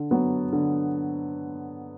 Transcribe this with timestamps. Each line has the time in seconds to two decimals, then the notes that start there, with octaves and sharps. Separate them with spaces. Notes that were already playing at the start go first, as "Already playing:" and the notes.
Already playing: D3
0.11 F#3 B3
0.53 D3